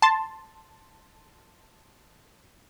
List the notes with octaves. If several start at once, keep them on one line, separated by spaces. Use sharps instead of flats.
A5 C6